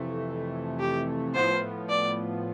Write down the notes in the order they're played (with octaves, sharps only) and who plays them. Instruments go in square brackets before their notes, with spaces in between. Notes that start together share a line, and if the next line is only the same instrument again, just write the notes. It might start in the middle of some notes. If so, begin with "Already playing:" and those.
Already playing: [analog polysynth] F2 C3 E3 A3
[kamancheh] G4
[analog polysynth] A2 F3 B3 F4 [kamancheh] C5
[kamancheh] D5